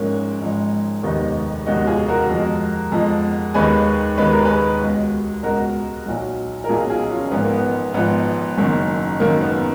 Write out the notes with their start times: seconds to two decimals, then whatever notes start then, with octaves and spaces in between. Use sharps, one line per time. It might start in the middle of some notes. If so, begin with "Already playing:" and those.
Already playing: G#1 G#2 F3 G#3 A#3 C#4
0.41 G#1 G#2 F3 G#3
1.03 F1 D#2 D#3 G#3 B3 D#4
1.66 F1 D#2 D#3 G#3 D#4 F#4
1.87 F4 G#4
2.08 F#4 A#4
2.29 F2 F3 G#3
2.92 F2 F3 G#3
3.54 D#2 D#3 G#3 G#4 B4
4.17 D#2 D#3 G#3 B4
4.32 A#4
4.45 G#4 B4
4.81 C#2 B2 G#3
5.43 C#2 B2 G#3 F#4 A#4
6.06 B1 A#2 F#3
6.64 A#4
6.69 B1 A#2 F#3 F4 G#4
6.90 F4 G#4
7.10 C#4 F4
7.32 G#1 G#2 F3 B3
7.43 A#3
7.53 B3
7.94 G#1 G#2 F3 B3
8.57 F#1 F#2 D#3
9.20 F#1 F#2 D#3 A#3
9.41 B3